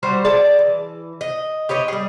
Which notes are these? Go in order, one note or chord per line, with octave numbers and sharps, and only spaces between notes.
G3 F#4 C5
G#4 D5 A5
E3
D#5
G4 B4 C#5 D#5
G3 G#4